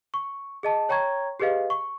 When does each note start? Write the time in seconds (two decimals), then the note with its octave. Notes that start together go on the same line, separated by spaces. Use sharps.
0.14 C#6
0.63 G#4 D#5 A5
0.89 C#5 G5 A#5 C#6 G#6
1.40 G4 G#4 B4 D#5 F5
1.70 C#6